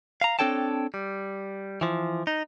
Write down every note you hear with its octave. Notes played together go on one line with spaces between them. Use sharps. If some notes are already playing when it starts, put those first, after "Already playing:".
F5 A#5
C4 D4 A4 C#5 G5 A5
G3
E3 F3
D#4